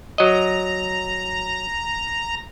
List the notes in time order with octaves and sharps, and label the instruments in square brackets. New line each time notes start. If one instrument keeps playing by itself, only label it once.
[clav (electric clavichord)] F#3 D#5 [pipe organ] A#5